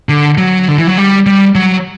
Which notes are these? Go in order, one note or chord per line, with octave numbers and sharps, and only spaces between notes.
D3
F#3
D3
E3
F#3
G3
G3
F#3